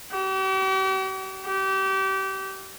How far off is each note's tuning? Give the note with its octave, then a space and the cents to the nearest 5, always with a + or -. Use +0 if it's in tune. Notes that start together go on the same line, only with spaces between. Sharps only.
G4 -45
G4 -30